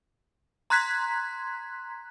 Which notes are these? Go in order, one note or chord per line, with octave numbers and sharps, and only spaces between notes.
A#5 C6 F#6 G#6 B6